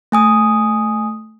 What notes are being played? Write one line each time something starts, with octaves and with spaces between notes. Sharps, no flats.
A3 G#5 D#6